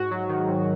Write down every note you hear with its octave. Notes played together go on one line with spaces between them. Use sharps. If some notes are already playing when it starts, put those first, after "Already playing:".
Already playing: G#2 F#4
F#3
D#3
G#2